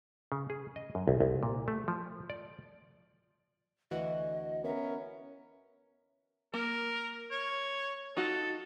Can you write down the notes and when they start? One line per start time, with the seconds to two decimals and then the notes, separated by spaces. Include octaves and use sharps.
0.32 C#3
0.50 G#4
0.76 D#5
0.95 F#2
1.08 C2
1.20 C2
1.43 A#2
1.68 A3
1.88 F3
2.30 D5
3.91 D2 E3 F#4 D#5
4.64 B3 C#4 A#4 E5
6.54 A#3 A#4
7.31 C#5
8.17 D#4 F4 F#4 A4